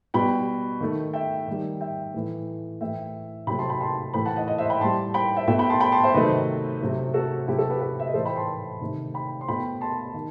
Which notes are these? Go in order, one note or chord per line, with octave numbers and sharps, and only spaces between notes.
B2 G3 G5 B5
D#3 A3
E5 G5
D#3 G3
E5 G5
A2 E3 A3
A2 E3 A3 E5 G5
C3 F#3 A3 G5 B5
A5 C6
G5 B5
A5 C6
A2 E3 A3 G5 B5
F#5 A5
D#5 F#5
D#5 F#5
C5 E5
G5 B5
A2 G3 A5 C6
G5 B5
E5 G5
B2 A3 E5 G5
G5 B5
A5 C6
G5 B5
A5 C6
C5 E5
C3 D#3 F#3 A3 B4 D#5
C3 F#3 A3
F#4 A4
C3 F#3 A3 E4 G4
F#4 A4
G4 B4
G4 B4
E5
D#5
A2 E3 A3 A4 C5
G5 B5
A5 C6
C3 D#3 A3
G5 B5
C6
B2 A3 G5 B5
A5 C6
D#3